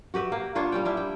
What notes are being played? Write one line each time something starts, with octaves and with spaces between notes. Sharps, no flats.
F#4 G4 B4 E5
A#3
A#3 D4 F4 C#5
G3 C#4 G5
A#3 D4 E4
G5